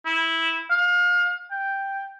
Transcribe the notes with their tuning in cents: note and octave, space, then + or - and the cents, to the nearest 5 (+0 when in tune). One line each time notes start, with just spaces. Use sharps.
E4 -10
F5 +30
G5 +0